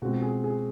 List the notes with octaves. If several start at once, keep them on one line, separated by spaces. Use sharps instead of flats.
B2 G#3 C4 F4 F#4
G#4
G#4